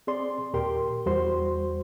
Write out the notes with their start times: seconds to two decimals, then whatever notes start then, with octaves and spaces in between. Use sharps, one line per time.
0.07 C4 G#4 D5 C6
0.54 D#2 A#2 G4 A#4 G5 C6
1.06 E2 G3 F#4 C5 C6